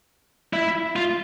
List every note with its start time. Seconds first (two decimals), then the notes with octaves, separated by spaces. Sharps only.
0.53 E4
0.96 F4